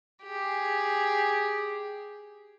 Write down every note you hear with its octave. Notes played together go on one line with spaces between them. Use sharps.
G4 G#4